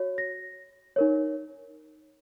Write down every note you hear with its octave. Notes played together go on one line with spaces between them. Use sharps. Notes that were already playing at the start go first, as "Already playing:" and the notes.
Already playing: F#4 C#5
A#6
D#4 A#4 C#5